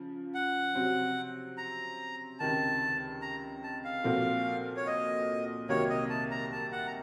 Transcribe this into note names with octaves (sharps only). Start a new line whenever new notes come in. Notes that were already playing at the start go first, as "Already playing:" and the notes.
Already playing: C#3 F3
F#5
C3 F#3 C4
A#5
C#2 C3 D#3 A5
A#5
A5
F5
A#2 F3 C4 F#4 A4
C#5
D#5
C2 C3 D#3 F#3 A#3 C#5
D#5
A5
A#5
A5
F#5
A#5